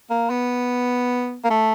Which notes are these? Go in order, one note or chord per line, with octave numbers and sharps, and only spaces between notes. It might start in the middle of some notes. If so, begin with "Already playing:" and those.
A#3
B3
A#3
A3